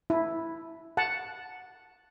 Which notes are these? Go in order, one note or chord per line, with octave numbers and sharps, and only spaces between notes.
E4
F#5 A5